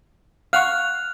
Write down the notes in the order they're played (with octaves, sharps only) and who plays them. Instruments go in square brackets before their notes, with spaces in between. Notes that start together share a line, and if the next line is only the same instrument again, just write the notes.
[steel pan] F5 F#5 C#6 [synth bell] F6 F#6 F7